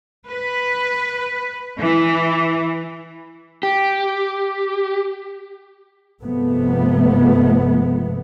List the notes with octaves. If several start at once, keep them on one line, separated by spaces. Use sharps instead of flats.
B4
E3
G4
G1 C3 F3 G#3 A3 B3